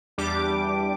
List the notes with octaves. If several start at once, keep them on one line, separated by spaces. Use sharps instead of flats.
E2 G3 D4 G4 D6